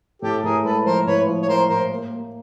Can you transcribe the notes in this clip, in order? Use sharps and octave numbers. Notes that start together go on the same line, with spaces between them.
A2 G4 A4
A2 G#4 A#4
G#3 A4 B4
F3 A#4 C5
A2 B4 C#5
F3
C#5
F3 A#4 C5
A2 A#4 C5
A#3
A#3